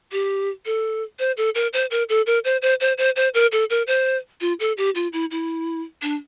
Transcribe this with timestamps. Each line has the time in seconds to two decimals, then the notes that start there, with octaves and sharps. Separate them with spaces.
0.12 G4
0.65 A4
1.19 C5
1.37 A4
1.55 A#4
1.73 C5
1.91 A#4
2.09 A4
2.26 A#4
2.44 C5
2.62 C5
2.80 C5
2.98 C5
3.16 C5
3.34 A#4
3.52 A4
3.70 A#4
3.87 C5
4.41 F4
4.60 A4
4.77 G4
4.95 F4
5.13 E4
5.31 E4
6.02 D4